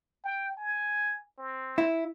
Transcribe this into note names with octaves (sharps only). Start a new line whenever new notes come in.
G5
G#5
C4
E4